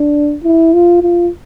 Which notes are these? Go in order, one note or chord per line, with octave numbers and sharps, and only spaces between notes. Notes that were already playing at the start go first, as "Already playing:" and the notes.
Already playing: D4
E4
F4
F4